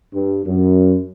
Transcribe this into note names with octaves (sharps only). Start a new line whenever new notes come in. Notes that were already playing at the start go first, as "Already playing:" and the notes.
G2
F#2